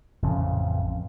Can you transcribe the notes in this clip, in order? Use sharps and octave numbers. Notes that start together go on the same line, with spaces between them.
A1 F2 C#3